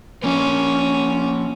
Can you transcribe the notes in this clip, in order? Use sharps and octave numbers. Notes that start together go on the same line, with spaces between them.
F3 A#3 C#4